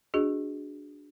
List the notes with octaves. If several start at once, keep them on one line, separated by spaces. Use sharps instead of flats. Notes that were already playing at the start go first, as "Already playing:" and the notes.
D4 F#4 G#4 D#5